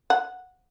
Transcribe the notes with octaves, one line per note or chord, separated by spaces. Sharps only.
F#5